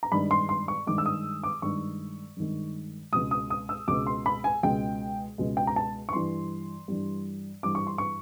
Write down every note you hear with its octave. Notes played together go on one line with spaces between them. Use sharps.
A#5
G2 D#3 G#3 B5
C6
C6
C#6
G2 D#3 G#3 D6
E6
D#6
D6
G2 D#3 G#3 C#6
G2 D#3 G#3
C#2 B2 G#3 D#6
D#6
D#6
E6
C#2 B2 G#3 D6
C6
B5
G#5
C#2 B2 G#3 G5
C#2 B2 G#3
G5
A#5
A5
C#6
G2 E3 G3 C6
G2 E3 G3
G2 E3 G3 D6
C#6
C6
C#6